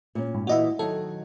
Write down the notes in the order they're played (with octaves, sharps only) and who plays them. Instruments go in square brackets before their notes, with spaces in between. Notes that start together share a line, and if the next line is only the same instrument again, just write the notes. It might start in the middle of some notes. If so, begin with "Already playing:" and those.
[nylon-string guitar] A#2 C#4
[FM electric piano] G#2
[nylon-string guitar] A#2 E3 F#5 [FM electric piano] F#4 D#5 E5
[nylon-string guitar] D#3 F#3 [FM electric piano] A4